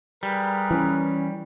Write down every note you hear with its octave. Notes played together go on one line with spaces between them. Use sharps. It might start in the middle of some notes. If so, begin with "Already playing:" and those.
G3 G#4 A#4 B4
E3 C#4